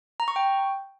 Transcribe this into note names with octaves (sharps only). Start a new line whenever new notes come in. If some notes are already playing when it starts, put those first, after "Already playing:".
A#5
C#6
G5